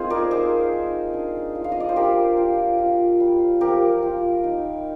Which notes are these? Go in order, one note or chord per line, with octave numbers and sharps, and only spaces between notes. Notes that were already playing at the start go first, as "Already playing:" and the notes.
Already playing: A#3 C4 D#4 F4 G#4 C5
A#4 D5
D#4 G#4 C5
D#4
D4
F4
F5
D#5
D5
C5
D4 G4 A#4
F4
F4
G3
F3 G4 A#4
F4
D#4